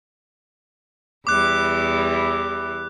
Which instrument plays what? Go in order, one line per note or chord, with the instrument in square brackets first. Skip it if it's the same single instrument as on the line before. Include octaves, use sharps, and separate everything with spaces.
[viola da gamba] E2 E3 G3 [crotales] D6 F#6